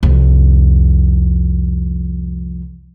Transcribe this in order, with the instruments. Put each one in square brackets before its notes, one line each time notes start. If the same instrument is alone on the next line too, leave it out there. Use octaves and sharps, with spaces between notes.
[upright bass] C2 F2